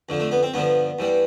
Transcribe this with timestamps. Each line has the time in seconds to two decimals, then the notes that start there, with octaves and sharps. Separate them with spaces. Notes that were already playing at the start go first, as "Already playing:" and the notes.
0.09 F2 D3 F3
0.20 A3
0.31 B3
0.43 C4
0.54 G2 D3 F3 B3
0.99 G2 E3 G3